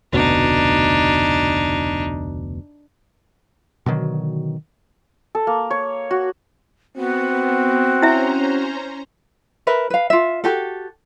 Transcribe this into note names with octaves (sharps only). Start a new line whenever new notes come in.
F1 D2 B2 D4 D#4
B2 D3 D#3 F#3
A4
A#3
C#5
F#4
B3 C4 F#4
C#4 E4 C5 E5 A#5
A#4 B4 E5
B4 F5
F4 E5
F#4 G4 A4